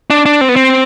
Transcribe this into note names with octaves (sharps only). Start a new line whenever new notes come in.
D4
D4
C4
B3
C4